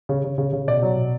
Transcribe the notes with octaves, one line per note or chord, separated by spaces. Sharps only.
C#3
C#3
C#3
C#3
B2 D5
F#3
B2